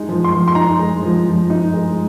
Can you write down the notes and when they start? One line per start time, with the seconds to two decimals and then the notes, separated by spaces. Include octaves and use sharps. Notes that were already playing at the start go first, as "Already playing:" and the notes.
Already playing: G#3 D#4
0.09 F3
0.24 C6
0.33 F3
0.48 C6
0.55 D#4 A#5
0.79 G#3
1.03 F3
1.26 F3
1.50 D#4
1.74 G#3